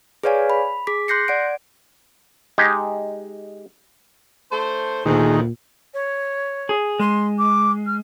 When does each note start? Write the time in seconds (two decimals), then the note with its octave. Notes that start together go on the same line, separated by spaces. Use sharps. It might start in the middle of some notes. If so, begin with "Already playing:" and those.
0.24 G#4 B4 C#5 D5 F5 G#5
0.50 B5
0.87 G#4 D6 B6
1.08 C6 F#6 G6 A#6 C7 C#7
1.28 D5 F#5 D7
2.58 G#3 D#4 G4
4.52 A3 D4 C5
5.06 D2 A#2 D#3 G#4
5.93 C#5
6.69 G#4
7.00 G#3 C6
7.38 D6
7.86 F6